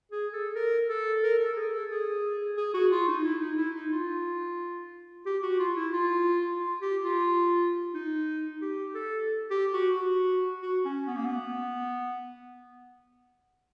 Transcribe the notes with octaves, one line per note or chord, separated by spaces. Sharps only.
G#4
A4
A#4
A4
A#4
A4
G#4
A4
G#4
G#4
F#4
F4
D#4
E4
D#4
E4
D#4
F4
G4
F#4
F4
E4
F4
F4
G4
F4
D#4
G4
A4
G4
F#4
F#4
F#4
C#4
B3
A#3
B3